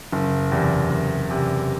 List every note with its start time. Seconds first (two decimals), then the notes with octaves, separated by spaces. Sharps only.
0.12 F#1
0.52 E2 C3
0.90 F#1
1.30 E2 C3